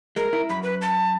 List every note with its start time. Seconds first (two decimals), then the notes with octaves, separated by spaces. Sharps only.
0.16 G#3 A#4
0.33 E4
0.49 F#2 B5
0.63 B4
0.82 A5